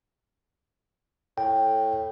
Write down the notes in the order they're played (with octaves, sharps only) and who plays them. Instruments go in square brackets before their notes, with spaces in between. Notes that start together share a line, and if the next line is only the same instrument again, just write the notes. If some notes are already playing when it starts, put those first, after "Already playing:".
[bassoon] A2 [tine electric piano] G5